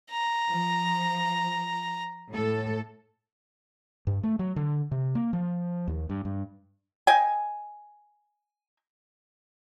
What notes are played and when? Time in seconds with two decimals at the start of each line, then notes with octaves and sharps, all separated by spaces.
0.10 A#5
0.49 F3
2.30 A2 A4
4.07 G2
4.23 A3
4.39 F#3
4.56 D3
4.91 C3
5.15 A#3
5.33 F3
5.88 D#2
6.09 G2
6.25 G2
7.07 D#5 G5 G#5